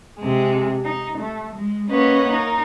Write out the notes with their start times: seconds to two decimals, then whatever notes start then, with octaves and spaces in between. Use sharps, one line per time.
0.20 C3 G#3
0.84 D#4
1.18 A3
1.54 G#3
1.90 A#3 C#4 B4 C#5 D#5 F#5
2.32 D#4 A#4